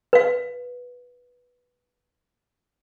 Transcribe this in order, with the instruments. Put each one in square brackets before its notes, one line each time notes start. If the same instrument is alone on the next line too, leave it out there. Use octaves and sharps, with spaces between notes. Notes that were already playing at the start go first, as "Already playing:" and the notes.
[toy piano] B4 F5